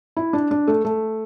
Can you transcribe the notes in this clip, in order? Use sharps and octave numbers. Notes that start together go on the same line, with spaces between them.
E4
D4
D4
A3
A3